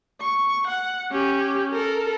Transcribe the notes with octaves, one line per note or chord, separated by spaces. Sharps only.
C#6
F#5
C#4 G4
A4 A#4